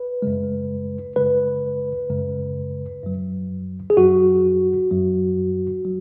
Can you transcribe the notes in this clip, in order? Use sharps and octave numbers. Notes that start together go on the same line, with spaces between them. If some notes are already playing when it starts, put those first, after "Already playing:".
Already playing: B4
F#2 C#3 G#3
F#2 C#3 G#3 B4
F#2 C#3 G#3
F#2 F#3
G#4
F#2 F#3 F#4
F#2 F#3
F#3